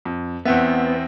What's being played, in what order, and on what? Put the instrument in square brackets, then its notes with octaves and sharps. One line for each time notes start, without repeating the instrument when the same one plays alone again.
[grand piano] F2
[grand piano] E2 C4 E5 [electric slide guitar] B3